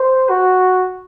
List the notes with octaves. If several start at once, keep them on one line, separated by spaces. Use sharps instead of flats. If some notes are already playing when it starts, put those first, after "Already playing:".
Already playing: C5
F#4